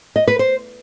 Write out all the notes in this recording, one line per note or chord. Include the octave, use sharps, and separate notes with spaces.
D#5
B4
C5